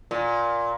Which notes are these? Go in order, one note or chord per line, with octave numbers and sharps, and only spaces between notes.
A#2